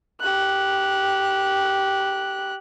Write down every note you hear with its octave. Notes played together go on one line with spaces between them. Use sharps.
G4 F#6